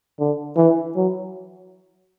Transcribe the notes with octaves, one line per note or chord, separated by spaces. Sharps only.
D3
E3
F#3